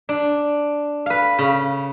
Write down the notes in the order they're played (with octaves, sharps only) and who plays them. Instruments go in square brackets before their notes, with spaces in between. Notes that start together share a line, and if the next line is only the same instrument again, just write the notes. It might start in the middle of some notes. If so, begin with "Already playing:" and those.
[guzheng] D4
B4 F5
C#3